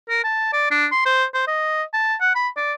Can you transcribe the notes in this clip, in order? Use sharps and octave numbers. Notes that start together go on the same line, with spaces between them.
A#4
A5
D5
D4
C6
C5
C5
D#5
A5
F#5
B5
D5